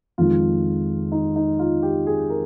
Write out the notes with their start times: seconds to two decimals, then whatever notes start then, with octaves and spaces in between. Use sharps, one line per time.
0.18 F2 D#3 G#3 F4
1.12 D#4
1.36 D#4
1.59 F4
1.83 G4
2.07 G#4
2.30 A#4